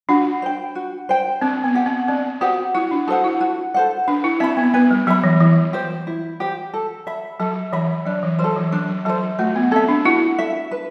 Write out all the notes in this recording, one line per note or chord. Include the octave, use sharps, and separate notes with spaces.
D4 F#4
C5 G5
F#4
C5 G5
C4 D4
B3
G4 C5 F#5
C4
C4 D4
F#4 G4 C5 F#5
E4 F#4
D4
F#4 A4 C5 F#5
E4
F#4
A4 C5 F#5
D4 B4
E4
C4 E5 B5
B3
B3 B4
G3
F#3 E5 B5
E3
E3 E4
G4 C5
E4
G4 C5
A4
E5 B5
F#3 A4
E3 E5 B5
F#3 D4
E3
F#3 C5
A4
E3
F#3 D4
F#3
F#3 A4 C5
A3 F#4
B3
C4 A4 E5
D4
E4 F#4
A4 E5
B4